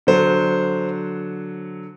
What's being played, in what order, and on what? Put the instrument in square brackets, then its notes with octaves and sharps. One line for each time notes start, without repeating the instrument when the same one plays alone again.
[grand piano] D3 F#3 C5